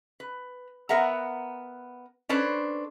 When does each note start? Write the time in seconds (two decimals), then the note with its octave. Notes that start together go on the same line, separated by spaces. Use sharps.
0.20 B4
0.89 B3 A#4 E5 F#5 A#5
2.29 C#4 D4 A4 B4 C5